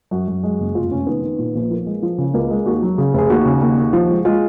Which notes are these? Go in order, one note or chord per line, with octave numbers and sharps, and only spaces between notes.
F#2 F#4
F#2
G#3
F#1
F1 F4
F1 C#4
D#3 B3
D#3
A#2
A#1
F3 A#3
G#3
F3
C#3
C#2 A#3
G#3
D#2 F#4
F#3
C#3 G#4
F1 G#4
D#2 F#4
C#3
D#2
D#2
F3
G#3
G#3 F4